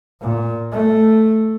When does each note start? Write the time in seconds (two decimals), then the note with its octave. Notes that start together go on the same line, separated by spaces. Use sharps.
0.21 A#2
0.72 A3